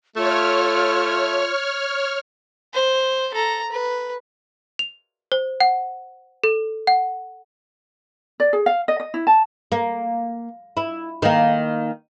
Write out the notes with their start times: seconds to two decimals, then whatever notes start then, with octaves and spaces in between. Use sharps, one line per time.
0.17 A3 F4 C#5 F6
2.74 C5
3.34 A4 A#5
3.72 B4
4.79 F7
5.32 C5
5.60 F#5
6.44 A4
6.87 F#5
8.40 D5
8.53 G#4
8.66 F5
8.88 D#5
9.00 D#5
9.14 E4
9.27 A5
9.72 A#3
10.77 E4
11.22 D#3 A#3